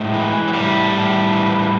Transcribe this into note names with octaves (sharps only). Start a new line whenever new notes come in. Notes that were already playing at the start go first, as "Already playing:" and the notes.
Already playing: A2 G#3
E3
F#3
A2 G3
A2
E3